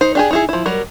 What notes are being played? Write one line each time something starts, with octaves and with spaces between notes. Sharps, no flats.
D#4 C5
D4 G4 G#4
D#4 E4 G#4
F3 E4
F#3 G3 A#4